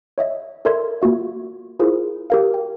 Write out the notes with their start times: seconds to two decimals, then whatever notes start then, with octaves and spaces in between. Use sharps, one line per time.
0.18 C#5 D#5 E5
0.65 A4 A#4 D5 E5 C6 G#6
1.02 A#3 F4 F#4 E5
1.79 E4 F4 G#4 A#4 C5
2.30 G4 A#4 F5
2.54 G5